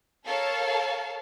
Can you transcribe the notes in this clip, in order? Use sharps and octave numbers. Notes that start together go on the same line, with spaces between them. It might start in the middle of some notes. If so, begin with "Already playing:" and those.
A4 A#4 C#5 F5 A5